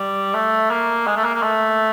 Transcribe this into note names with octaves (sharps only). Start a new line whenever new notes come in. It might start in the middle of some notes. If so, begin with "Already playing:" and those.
Already playing: G3
A3
A#3
G#3
A3
A#3
A#3
A3